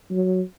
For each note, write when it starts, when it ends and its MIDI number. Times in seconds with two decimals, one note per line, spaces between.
0.11 0.41 54